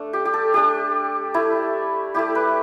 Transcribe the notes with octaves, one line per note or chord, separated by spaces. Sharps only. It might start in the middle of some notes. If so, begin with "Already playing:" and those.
Already playing: A3 D4
G4
G4
A4
A3 D4 G4
A3 E4
A3 E4 G4
B4